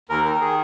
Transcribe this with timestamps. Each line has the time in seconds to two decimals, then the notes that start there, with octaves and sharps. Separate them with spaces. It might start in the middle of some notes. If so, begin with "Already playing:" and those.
0.09 D#2 A#4
0.25 D#3 A#4
0.41 D#3 G#4